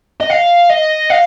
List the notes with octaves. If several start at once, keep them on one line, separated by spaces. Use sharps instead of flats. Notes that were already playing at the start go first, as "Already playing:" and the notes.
D#5
F5
D#5
F5